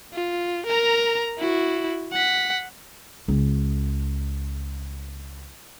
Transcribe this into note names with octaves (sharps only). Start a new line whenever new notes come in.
F4
A#4 A#5
E4 F#4
F#5 B6
C#2 F4